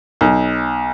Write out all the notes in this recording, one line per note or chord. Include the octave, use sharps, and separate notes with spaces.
B1